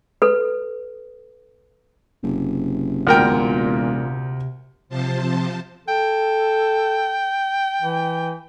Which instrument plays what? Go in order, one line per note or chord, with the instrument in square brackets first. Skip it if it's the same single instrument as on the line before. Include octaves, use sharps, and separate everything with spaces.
[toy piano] A4 B4
[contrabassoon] F#1 [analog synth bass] C3
[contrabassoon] E1 [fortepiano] D2 A#4 G5 [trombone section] A#2
[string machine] C3 F3 C5 A5
[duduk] A4 [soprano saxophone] G5
[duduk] E3